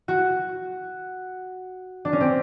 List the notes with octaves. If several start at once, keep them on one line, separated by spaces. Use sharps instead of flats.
F#4
D4
C#4
C4